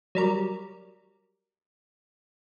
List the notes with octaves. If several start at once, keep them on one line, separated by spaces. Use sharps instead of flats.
F#3 G3 A#4